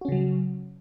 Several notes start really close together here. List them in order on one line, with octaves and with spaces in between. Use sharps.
F#4 C#4 C#3 F#3